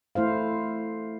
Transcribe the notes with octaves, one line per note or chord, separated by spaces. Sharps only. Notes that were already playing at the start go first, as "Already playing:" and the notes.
A3 E4 C5 F5